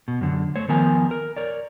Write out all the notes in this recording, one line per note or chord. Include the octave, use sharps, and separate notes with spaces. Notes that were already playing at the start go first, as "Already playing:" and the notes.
B2
F#2 D3
A3 C5 C#5
D#3 F3 B3 A#4 G#5
A#4
A#4 C#5 D5